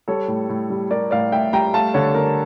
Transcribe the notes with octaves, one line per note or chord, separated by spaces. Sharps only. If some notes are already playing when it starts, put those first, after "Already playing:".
G3 A4 C#5
A2
A2
G3
G3 A#4 D5
A2 D5 F5
A2 E5 G5
G3 G5 A#5
A3 F5 A5
D3 A4 C#5
D3 A#4